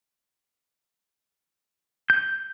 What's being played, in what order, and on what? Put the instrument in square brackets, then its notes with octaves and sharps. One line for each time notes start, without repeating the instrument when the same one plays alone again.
[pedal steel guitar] G6